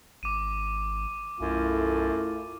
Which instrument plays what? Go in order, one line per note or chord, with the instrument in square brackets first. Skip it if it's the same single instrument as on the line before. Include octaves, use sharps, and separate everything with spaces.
[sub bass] G#1 [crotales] D6 D#7
[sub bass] B1 [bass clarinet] F#2 [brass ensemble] A3 E4 F4